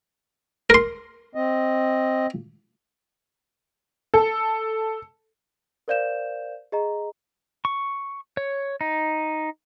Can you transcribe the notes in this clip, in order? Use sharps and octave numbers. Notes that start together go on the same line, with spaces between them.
A#4 C6
C4 D#5
A4
A#4 C5 D5 F5 G6 E7
G#4 D#5 A#5
C#6
C#5
D#4